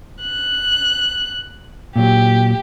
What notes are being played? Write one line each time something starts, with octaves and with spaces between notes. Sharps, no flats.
F#6
A#2 F#3 G4